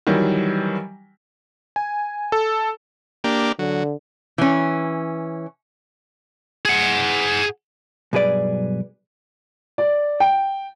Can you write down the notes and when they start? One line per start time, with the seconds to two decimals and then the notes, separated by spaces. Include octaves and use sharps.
0.07 D#3 E3 F#3 G3
1.76 G#5
2.32 A4
3.24 A#3 D4 G4
3.59 D3 F#3
4.38 E3 C#4
6.65 G#4 F#5
8.13 B1 G2 G#4 B4 D5
9.78 D5
10.20 G5